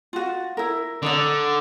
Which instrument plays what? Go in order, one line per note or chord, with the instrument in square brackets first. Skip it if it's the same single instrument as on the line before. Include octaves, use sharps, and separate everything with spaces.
[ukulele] F4 F#4
E4 A#4
[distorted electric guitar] D3 [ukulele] D4 D#4 D5